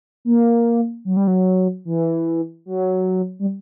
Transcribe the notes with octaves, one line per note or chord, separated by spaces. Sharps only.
A#3
F#3
G3
F#3
E3
F#3
G3